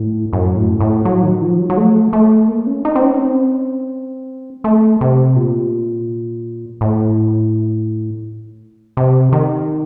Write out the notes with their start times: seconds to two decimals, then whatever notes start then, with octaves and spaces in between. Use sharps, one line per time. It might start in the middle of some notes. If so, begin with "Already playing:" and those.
Already playing: A2
0.33 F#2
0.56 A2
0.81 A2
1.05 F#3
1.23 D#3
1.41 F3
1.59 F#3
1.70 F#3
1.77 A3
2.13 A3
2.48 A#3
2.67 C#4
2.85 D#4
2.95 C4
3.03 C#4
3.21 C4
4.64 A3
5.01 C3
5.36 A#2
6.81 A2
8.97 C3
9.32 D#3